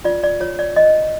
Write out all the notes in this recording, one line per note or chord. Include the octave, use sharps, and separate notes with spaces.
F4 D5
D5
F4 C#5
D5
C#5 D#5